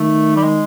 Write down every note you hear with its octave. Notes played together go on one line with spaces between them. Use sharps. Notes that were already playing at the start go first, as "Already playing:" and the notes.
Already playing: D#3 A3
G3
G#3